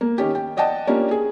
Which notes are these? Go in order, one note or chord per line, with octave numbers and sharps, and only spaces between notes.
A#3
D#3 C#4 G4
G5
D5 D#5 F#5 G5 A5
A#3 C#4 D4 F4 G4
G#4